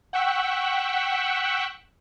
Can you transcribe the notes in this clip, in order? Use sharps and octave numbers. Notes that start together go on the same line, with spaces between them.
F#5 G5 C#6 E6 F#6 B6